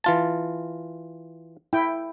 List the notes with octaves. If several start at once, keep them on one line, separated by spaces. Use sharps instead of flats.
E3 F4 A5
E4 G5